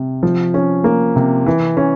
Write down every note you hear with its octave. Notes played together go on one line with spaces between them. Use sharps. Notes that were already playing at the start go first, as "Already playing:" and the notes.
Already playing: C3
F3
C#4
A#3
C3
E3
C#4